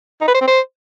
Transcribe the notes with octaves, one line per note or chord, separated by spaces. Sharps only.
D#4
B4
C5
C4
C5